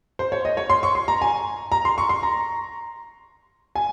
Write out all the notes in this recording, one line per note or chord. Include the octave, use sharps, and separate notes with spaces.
C5
C#5
D#5
C#5
C6
C#6
C6
A#5
G#5
A#5
C6
C#6
C6
A#5
G#5